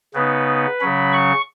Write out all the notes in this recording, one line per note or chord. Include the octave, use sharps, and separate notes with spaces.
C#3 B3 D#4 B4
C#3 F#3 C#4 B5
C#6